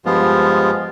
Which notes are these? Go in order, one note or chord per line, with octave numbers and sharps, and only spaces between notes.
G2 F3 G#3 B3 F4